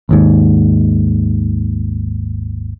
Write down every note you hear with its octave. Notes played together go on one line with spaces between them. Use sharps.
G#1 D#2 G#2